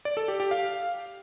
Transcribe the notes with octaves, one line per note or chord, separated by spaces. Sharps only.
D5
A4
G4
G4
F5